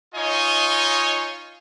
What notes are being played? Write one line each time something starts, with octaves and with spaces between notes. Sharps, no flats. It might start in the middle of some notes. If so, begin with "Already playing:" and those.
D#4 F4 C#5 D#5 G#5